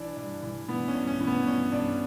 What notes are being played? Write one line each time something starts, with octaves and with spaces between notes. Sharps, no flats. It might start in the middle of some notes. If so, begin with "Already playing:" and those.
Already playing: E3 D4
G2
E3
E3 B3
C#4
G2
C#4
E3
B3
G2 C#4
G2 D4